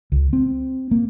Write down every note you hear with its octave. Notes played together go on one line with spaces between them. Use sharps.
C#2
C4
A#3